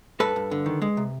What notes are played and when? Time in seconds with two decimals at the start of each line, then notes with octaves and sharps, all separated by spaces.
0.20 G2 A4 B4
0.36 G2
0.51 D3
0.66 D#3
0.82 G#3
0.97 C3